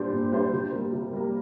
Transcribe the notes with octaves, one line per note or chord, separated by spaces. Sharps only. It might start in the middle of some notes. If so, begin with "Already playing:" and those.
Already playing: A#2 G3 D4 G4 C5
A#2
G3 D4 G4 C5
C3
G3 A#3
C3
G3 A#3